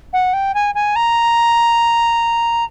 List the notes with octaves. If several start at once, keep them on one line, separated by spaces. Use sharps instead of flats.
F#5
G5
G#5
G#5
A#5